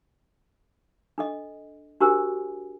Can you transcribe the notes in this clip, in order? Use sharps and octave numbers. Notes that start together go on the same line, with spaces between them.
D4 A4 D#5
D4 F#4 G4 A#4 C5 G#5